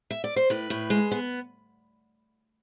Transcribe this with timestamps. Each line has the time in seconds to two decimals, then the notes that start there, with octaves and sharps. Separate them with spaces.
0.10 E5
0.24 D5
0.36 C5
0.50 A2 B4
0.70 A2
0.90 G#3
1.11 B3